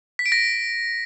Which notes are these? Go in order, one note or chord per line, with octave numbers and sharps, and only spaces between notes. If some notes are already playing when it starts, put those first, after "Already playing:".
B6
D7
A#6